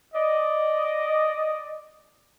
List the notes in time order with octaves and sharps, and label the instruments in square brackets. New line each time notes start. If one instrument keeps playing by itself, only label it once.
[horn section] D5 D#5